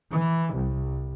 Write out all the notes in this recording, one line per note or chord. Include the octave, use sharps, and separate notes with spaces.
E3
C2